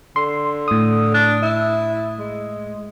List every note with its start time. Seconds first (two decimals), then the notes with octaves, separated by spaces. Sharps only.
0.16 D3 C6
0.68 A2 D#6
1.14 D4
1.42 E4
2.19 G#3